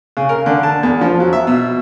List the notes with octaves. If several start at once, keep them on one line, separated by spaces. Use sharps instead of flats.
C#3
A#4
D3
A5
E2
F3
F#3
E5
B2